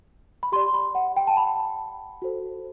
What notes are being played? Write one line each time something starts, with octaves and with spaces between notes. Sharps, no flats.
B5
G4 D5 C6
B5
F#5
G5
A5
B5
F#4 A4 C5